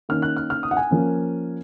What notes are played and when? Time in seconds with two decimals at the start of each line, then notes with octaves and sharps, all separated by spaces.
0.09 D#3 A#3 C#4 F6
0.22 F#6
0.37 F6
0.50 F6
0.63 D#6
0.71 F#5
0.77 G#5
0.91 F3 A#3 C#4